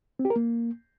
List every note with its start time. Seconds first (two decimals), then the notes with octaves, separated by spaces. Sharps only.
0.19 C4
0.25 G4
0.30 A#4
0.36 A#3